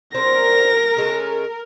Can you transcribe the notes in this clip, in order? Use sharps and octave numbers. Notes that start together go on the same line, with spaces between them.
C4 A#4 C5 D5 A#6
C#3 G#3 A3